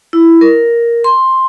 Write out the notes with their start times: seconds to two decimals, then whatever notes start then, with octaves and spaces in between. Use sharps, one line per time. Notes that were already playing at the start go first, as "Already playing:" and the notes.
0.13 E4
0.41 A#4
1.04 C6